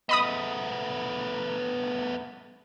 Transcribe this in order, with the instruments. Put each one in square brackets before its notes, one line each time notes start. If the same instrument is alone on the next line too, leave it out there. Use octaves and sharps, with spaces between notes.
[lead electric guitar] A3 B3 [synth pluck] D#5 B5 D#6